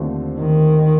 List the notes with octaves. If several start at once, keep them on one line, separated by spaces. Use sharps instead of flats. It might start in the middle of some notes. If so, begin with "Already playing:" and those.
Already playing: D#2 D3 F3 A3 C4
D#3